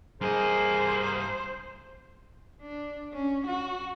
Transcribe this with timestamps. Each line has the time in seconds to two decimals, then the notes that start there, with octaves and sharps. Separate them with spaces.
0.21 G2 A#3 G#4 C5 D#5
2.62 D4
3.13 C#4
3.46 F#4